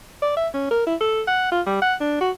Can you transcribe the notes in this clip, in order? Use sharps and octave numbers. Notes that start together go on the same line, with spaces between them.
D5
E5
C#4
A#4
E4
A4
F#5
F4
G3
F#5
D4
F#4